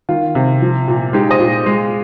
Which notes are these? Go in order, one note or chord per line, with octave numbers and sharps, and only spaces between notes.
D#3 F4
C3
F3
A#2
G#3 D#4 G4
C5 D#5
A#2
G#3